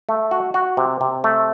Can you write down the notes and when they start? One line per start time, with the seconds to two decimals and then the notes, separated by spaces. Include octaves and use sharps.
0.09 A3
0.31 F#4
0.54 F#4
0.77 C3
1.01 C3
1.24 A3